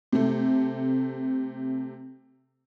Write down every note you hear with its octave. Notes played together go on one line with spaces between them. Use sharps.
C3 A3